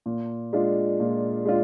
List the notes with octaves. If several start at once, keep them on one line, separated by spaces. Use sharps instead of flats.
A#2
G#3 D4 F4
A#2
G#3 D4 F4